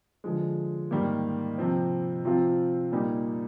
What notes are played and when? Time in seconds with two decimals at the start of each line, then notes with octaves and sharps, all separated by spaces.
0.24 D3 F3 G#3
0.91 G#2 D#3 G3 A#3
1.58 C3 F3 C4
2.25 C3 F3 C4 F4
2.92 A#2 G3 A#3 D#4